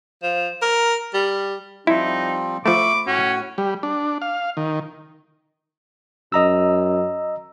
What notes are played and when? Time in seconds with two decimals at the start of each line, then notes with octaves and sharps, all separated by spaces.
0.23 F3
0.62 A#4
1.14 G3
1.87 F3 G3 C4 D#4 E4
2.66 F3 A3 E5 B5 C#6 D6
3.07 A2 C#4 F#4
3.58 G3
3.83 D4
4.22 F5
4.57 D#3
6.32 F#2 D#5 A#5 E6